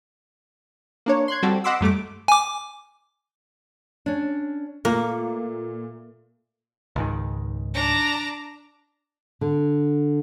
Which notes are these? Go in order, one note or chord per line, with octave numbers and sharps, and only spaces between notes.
A#3 D4 C#5
C6 F#6 G#6
G3 C4 F#4 A4
D#5 F#5 B5 C6 D6 E6
F#2 G3 A3 D6
G#5 D6
C#4 D4
A#2 A3 A#3
C#2 G#2 D#3
D4 A#5
D3